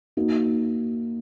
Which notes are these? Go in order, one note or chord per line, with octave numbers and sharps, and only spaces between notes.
A#3 D#4 F#4